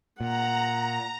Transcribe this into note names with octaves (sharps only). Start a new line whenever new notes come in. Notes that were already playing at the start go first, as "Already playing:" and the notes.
A#2 F#5 A#5